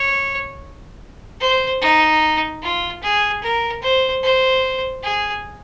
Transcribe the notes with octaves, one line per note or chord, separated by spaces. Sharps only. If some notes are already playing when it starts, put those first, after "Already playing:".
Already playing: C#5
C5
D#4
F4
G#4
A#4
C5
C5
G#4